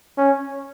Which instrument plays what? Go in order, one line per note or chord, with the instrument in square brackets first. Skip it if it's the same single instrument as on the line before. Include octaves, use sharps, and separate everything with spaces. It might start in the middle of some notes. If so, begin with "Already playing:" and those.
[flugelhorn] C#4